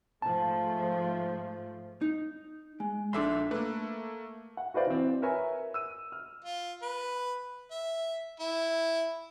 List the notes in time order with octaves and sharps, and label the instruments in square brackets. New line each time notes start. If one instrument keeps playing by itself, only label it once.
[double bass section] G#2 F3 A3 [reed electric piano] A5
[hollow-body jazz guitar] D#4
G#3
[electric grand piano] A#1 E5 D6 [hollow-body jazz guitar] D4 A4 C6
[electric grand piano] A3 A#3 [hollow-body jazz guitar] B4
[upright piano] F#5
F#4 B4 C5 D5 F5
E3 C4
A#4 B4 C#5 E5 G#5 A#5
E6 D#7
F6
[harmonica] F4
B4
E5
E4